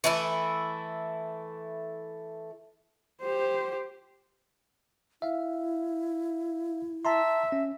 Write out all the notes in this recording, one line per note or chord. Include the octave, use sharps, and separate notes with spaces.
E3 A3 E4
G4 C5
E4 E5 F5
E5 A5 A#5 C6
C#4